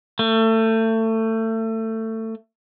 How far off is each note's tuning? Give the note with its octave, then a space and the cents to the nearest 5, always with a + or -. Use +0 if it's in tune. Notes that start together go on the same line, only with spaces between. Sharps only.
A3 +25